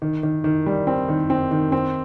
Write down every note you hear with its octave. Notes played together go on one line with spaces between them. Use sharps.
D#3
D#3
D#3
G3
C4
D#3
C4
D#3
C4